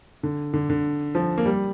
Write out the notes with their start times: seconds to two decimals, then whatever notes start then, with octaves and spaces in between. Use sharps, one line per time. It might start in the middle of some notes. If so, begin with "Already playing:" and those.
0.23 D3
0.53 D3
0.70 D3
1.15 F3
1.38 A#3
1.46 G3